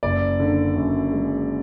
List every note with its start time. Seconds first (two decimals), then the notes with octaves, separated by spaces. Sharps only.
0.03 F#1 D5
0.40 D3
0.76 F#2
1.13 G#3